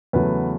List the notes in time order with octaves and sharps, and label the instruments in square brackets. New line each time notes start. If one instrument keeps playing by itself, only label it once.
[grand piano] E2 C#3 F#3 A3 B4